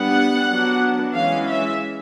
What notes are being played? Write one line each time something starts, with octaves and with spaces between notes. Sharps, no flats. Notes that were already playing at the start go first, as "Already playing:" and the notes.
Already playing: G3 B3 D4 F#5
F#3 B3 D4
E3 G#3 C#4 F5
E5